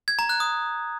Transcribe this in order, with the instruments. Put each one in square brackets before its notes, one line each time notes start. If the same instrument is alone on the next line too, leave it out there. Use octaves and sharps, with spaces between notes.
[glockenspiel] G#6
A#5
F#6
D#6